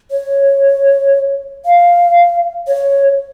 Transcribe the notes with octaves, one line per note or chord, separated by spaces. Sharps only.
C#5
F5
C#5